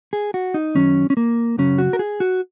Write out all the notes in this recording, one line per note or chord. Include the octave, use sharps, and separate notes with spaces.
G#4
F#4
D#4
F#2 D#3 F#3 C#4
C#4
A#3
F#2 C#3 F#3 C#4
F#4
A#4
G#4
F#4